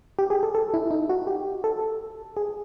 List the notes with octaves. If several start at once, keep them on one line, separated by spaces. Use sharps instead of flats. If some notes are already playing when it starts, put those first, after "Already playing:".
G4
G#4
A4
A4
E4
D#4
F#4
G4
A4
G#4